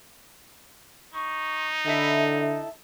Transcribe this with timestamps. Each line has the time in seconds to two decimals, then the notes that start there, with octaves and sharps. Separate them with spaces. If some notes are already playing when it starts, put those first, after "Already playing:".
1.14 D#4 C#6
1.86 D3 E4 A4 D#5 E5